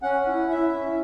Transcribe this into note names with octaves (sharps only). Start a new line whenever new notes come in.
C#4 F#5
E4
E4 E5
C#4